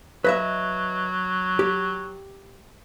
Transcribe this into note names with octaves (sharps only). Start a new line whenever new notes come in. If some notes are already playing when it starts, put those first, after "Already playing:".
F#3 B4 D#5 E5
G4